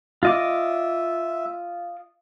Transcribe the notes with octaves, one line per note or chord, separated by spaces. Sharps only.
F4 D#5 E5 D6